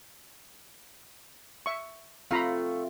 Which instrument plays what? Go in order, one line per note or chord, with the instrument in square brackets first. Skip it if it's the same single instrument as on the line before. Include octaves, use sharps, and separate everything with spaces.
[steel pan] E5 C#6
[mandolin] A3 [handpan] C4 F4 [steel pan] F5 A#5 B5